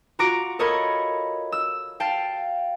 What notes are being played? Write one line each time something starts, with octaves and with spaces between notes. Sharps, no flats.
F4 F#4 A#5 D6 A#6 D7
A4 A#4 C#5 D#5 B5 G#6
E6
F5 G5 A5